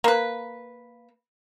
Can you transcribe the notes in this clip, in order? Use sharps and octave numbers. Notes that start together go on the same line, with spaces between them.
A#3 B4